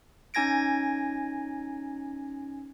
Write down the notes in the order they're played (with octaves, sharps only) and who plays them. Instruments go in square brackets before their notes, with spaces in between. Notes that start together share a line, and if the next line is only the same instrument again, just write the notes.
[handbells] C#4 D#4 G#5 G#6 A#6 D7